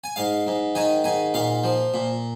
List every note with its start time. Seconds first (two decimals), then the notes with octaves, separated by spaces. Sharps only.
0.04 G#5
0.16 G#2 F5
0.47 G#2
0.75 D#3 G#5
1.04 G#2 G#5
1.34 A#2 F5
1.64 F3
1.94 A#2